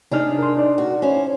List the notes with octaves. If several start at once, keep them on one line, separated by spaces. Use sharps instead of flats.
C3 D4 D#4 G#4 F6
A#4 C6
D#4 D5
F#4
C#4 E4 C5